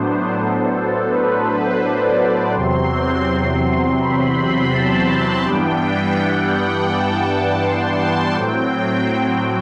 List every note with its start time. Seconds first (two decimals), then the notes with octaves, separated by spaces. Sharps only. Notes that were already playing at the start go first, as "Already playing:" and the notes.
Already playing: A2 F#3 B3 D4 C5
0.35 A4
1.07 B4
1.43 C5
1.80 D5
2.53 E2 C3 F#3 C4 C6
3.99 B5
4.71 A5
5.43 G2 E3 G3 B3 D4 G5
6.16 F#5
6.53 G5
6.90 A5
7.62 C6
7.98 A5
8.34 A2 F#3 C4 G5